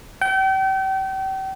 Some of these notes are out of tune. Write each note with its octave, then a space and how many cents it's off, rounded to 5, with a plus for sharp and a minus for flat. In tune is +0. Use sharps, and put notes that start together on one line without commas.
G5 -35